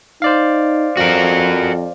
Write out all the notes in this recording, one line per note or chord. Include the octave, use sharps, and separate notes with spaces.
D#4 C5 D5 F5
F2 F#4 A#4